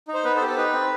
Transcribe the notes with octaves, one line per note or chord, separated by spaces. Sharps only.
D#4
C5
B3 B4
A4 C5
G4
A4
D#4 B4
C4